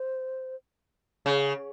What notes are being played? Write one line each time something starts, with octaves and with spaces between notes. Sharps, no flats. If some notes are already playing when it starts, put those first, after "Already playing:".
Already playing: C5
C#3